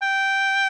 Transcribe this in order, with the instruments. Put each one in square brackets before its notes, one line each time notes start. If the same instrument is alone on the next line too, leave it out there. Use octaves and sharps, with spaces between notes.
[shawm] G5